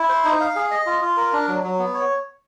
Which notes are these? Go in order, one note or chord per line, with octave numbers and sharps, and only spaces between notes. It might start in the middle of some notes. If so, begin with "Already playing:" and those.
Already playing: E4
C5
D#4
F5
G#4
D#5
F4
F4
A#4
D4
F#3
F#3
B3
C#5